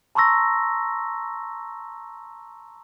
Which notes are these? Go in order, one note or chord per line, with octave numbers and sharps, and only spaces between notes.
A5 A#5 C6 C#6 E6 A#6